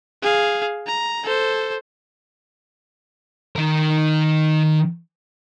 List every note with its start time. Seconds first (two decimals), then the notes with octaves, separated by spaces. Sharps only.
0.23 G#4 F5
0.87 A#5
1.24 A4 C5
3.56 D#3 A#4